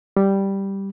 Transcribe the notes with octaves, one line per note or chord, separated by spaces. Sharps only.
G3